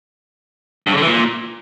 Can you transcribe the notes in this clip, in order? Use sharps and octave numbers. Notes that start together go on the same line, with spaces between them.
G2
C#3
D3
E3
A#2